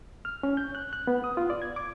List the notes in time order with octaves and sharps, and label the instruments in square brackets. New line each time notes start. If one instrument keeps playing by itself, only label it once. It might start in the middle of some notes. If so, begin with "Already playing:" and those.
[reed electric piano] F6
C#4
G6
F#6
F#6
B3
D#6
F4
D5
G#6
D6